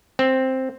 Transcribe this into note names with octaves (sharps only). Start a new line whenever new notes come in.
C4